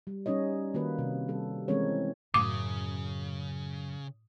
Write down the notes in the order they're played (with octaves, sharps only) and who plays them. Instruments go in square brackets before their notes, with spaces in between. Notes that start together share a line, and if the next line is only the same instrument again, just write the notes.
[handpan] G3
G3 C#4 D#4 C#5 D#5
D#3 A#3 F#4 B4
C3
G3 A4
E3 G#3 C4 C#4 A#4 C#5
[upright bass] F#2 [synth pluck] A2 D#6 [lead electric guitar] C#3 [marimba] D6